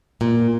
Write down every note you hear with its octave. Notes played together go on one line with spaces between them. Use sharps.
A#2